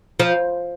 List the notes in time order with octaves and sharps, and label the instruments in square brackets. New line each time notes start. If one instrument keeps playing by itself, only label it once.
[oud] F3